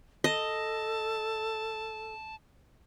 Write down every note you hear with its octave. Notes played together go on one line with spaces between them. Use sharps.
A4 D#5 A5